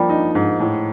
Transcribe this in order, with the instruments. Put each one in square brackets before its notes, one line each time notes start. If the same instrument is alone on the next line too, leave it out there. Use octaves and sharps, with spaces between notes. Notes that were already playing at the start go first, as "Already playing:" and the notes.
Already playing: [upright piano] F3 A#3 [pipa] G3
[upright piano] D#4
G#2
A2